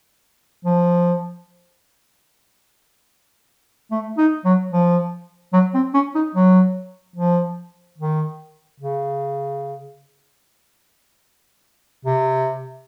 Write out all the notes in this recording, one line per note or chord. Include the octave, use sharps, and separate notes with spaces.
F3
A3
D#4
F#3
F3
F#3
C4
C#4
D#4
F#3
F3
D#3
C#3
C3